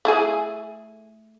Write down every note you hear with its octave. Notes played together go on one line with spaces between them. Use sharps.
A3 E4 G#4